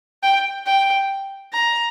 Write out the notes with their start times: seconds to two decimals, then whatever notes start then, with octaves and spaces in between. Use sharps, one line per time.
0.23 G5
0.66 G5
1.52 A#5